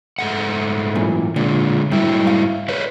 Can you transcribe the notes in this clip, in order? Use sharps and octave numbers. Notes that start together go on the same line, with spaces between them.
G#2 A3 F#5
F#2 A#2 E3
A#2 D3 G#3
G#2 F#3 G3 E4
F5
A#4 B4 C#5